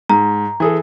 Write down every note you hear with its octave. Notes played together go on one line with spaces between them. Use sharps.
G#2 A#5
E3 G#4 A4